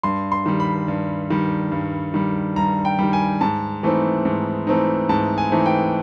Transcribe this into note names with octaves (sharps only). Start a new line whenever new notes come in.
G2 C6
C6
D#3 G3
B5
G2
D#3 G3
G2
D#3 G3
G2 A#5
G5
D#3 G3
G#5
G#2 A5
E3 A3 C4 D#4
G#2
E3 A3 C4 D#4
G#2 A5
G#5
E3 A3 C4 D#4
G5